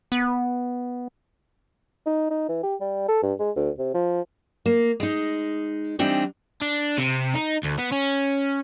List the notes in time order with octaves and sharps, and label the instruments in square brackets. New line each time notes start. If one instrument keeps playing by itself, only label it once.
[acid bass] B3
[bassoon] D#4
D#4
E3
G4
G3
A4
G2
G#3
D2
C3
F3
[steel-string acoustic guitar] A#3
G#3 D#4
E3 G3 C4 D4 D#4
[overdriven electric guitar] D4
C3
D#4
D2
B3
C#4